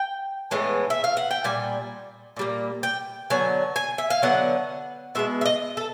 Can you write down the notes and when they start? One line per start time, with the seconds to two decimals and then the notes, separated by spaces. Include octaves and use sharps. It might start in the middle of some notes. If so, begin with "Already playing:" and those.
Already playing: G5
0.51 A2 E3 G#3 B3
0.90 E5
1.04 F5
1.17 F#5
1.31 G5
1.44 A#2 G3 G#5
2.37 A#2 G3 A#3
2.83 G5
3.30 D3 F#3 B3 G#5
3.76 G#5
3.98 E5
4.10 F5
4.22 D3 F#3 B3 F#5
5.15 B2 G#3 B3 E5
5.41 E5
5.46 D#5
5.77 A4